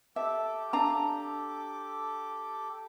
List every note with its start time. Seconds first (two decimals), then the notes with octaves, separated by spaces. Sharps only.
0.16 G4 A4 E5 D6
0.73 D4 F5 A#5